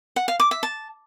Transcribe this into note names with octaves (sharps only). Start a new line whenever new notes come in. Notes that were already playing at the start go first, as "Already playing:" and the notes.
F#5
F5
D6
E5
A5